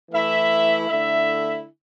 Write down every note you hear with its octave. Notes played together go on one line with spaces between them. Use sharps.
E3 A3 E4 E5
D3 A3 E4 E5